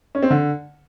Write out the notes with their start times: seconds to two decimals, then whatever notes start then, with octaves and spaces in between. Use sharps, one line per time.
0.15 C#4
0.23 C4
0.30 D3